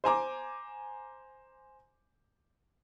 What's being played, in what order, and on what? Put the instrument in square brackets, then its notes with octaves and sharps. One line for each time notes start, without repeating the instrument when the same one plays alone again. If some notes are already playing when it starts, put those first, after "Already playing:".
[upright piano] C5 G#5 A#5 D6